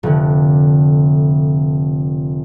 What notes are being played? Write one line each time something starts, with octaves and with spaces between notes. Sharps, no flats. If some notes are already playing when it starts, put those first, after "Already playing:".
F1 D3